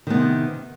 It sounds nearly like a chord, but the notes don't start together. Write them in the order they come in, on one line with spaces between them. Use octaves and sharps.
D#3 B3 C3